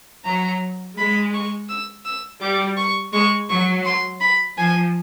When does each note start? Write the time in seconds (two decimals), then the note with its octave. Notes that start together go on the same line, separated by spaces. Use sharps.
0.25 F#3 A#5
0.97 G#3 B5
1.34 C#6
1.69 E6
2.05 E6
2.41 G3 D6
2.77 C#6
3.13 G#3 C#6
3.49 F#3 C#6
3.86 C6
4.20 B5
4.57 F3 G#5